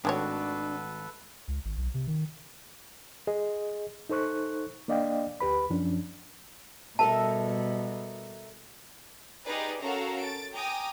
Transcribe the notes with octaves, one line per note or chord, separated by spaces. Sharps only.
G#1 D#3 A3 D4 F#4 A4 B4 C#5
C#2
G#1
B1
C3
D#3
G#4 D#5
D#4 A4 C5 C#6 F#6
A#3 D4 D5 D#5 F5 G5
D2 G4 B4 B5
F#2 F3 C#4 D4
B2 G3 A4 A#4 E5 A5
D#4 G4 G#4 B4 D5 D#5
C#4 F#4 A4 A#4 F5 A#5
A6 D7
G5 G#5 A#5 D6 D#6